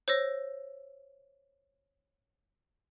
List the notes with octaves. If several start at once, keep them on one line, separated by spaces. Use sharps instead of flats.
C5 C#5 E6 A#6